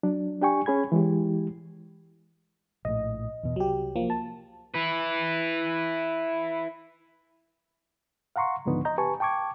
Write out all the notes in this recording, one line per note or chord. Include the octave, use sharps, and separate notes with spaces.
F#3 D4
D4 G4 G5 G#5 C#6
C#4 G#4 B5 G#6
E3 G#3 E4 G4
A#1 A2 D#5
E2 B2
C2 F#3 G4
F3 F#3 A#3
A5
E4 B4
F5 F#5 A#5 C6 C#6
C#2 G#2 D3 F3 B3 D#4
D#5 A#5 G6
G4 B4 G#5 A5 C#6
G5 A5 C#6 D6 G#6